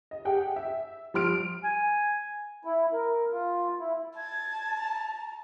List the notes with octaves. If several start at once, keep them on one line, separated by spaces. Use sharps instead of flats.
D#5
G4 G#4 F#5 G5
E5
F3 G3 C6 F6 D7
G#5
E4
A#4
F4
E4
A5 G#6
A#5